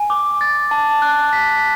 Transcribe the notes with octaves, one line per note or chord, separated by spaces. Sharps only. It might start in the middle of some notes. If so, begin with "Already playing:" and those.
Already playing: G#5
D6
A6
A5
F#6
B6